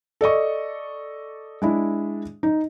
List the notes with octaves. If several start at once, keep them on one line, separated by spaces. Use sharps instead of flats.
A4 D5 D#5 C#6
G#3 D4 E4
D#4